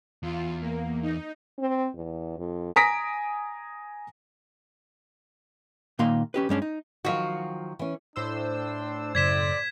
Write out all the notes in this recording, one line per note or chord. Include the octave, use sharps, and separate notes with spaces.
E2 F4
A#3
D#4
C4
E2
F2
G#5 A#5 D#6 A#6 B6 D7
A#2 D#3 A#3 D#5 F5 C6
C#4 G4 B4
G2 G#3 C#4 D4
D#4
D#3 F3 F#3 F#4 F5
E3 C#4
A2 D4 C5 E6
F#2 C#3 D5 G#6 B6 E7